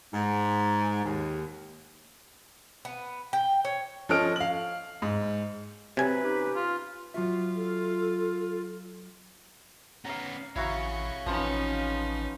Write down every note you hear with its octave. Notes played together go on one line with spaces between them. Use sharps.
G#2
D#2
B3
G5
C#5
F3 C#4 A4 D#5 F6 D7
F5 F#7
G#2
C3 F#3 B4 G#5
C#4 D#4 G4
F4
F#3 F4 F#4 E5
A4
B3 C#4 F5 A#5
A1 E4 F#4 C#5 F5 A#5 C#6
A1 F3 B3 C#4 D#4